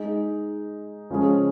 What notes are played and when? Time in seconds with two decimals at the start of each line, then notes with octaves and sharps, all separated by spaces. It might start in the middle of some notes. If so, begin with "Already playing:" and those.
Already playing: G#3 D#4 G#4
1.10 C#3 F3 G#3 C#4 G#4